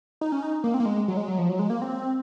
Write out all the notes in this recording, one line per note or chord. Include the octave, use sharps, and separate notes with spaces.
D#4
C#4
D#4
A#3
C4
A#3
G#3
F#3
G#3
F#3
F3
F#3
G#3
A#3
C4